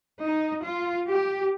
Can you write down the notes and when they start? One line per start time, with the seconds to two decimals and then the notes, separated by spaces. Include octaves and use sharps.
0.23 D#4
0.63 F4
1.07 G4